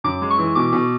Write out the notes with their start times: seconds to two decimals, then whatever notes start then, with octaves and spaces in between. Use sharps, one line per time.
0.04 F#2 D6
0.22 G#3
0.30 C#6
0.38 E3
0.55 B2 D6
0.73 B2